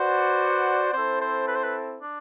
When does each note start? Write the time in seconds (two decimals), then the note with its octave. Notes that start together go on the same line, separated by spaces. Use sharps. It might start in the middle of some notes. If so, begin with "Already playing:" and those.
Already playing: F#4 B4 C5 D5 F#5
0.93 C4 E4 A4 C5
1.21 C5
1.48 B4
1.56 C5
1.64 B4
2.01 D4